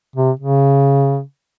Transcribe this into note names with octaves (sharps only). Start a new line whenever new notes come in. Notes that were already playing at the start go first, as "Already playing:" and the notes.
C3
C#3